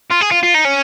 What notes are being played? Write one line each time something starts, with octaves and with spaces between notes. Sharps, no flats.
F4
G#4
F4
F4
D#4
C#4